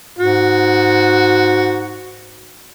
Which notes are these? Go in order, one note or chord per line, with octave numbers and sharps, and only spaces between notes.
G#2 F#4